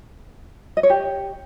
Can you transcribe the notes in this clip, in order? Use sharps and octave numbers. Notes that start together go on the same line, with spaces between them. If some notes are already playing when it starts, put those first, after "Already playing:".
D#5
C#5
G4